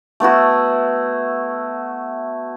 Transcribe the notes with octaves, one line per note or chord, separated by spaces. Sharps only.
A3 B3 E4 F#4